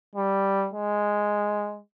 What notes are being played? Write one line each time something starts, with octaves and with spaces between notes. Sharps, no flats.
G3
G#3